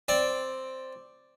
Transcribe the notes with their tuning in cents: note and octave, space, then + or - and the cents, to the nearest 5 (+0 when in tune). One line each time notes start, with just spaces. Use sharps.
C4 +0 D5 +0